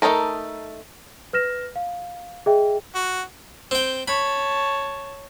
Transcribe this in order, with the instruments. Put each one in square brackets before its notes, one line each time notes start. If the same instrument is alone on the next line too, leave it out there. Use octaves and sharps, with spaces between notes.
[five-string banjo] A3 C#4 D#4 A4 A#4
[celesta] B4 F6 A#6 E7
F5
G#4 D#5 E5 G5
[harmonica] F#4
[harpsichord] C4 G5
[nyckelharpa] C#5 A5 [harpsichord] B5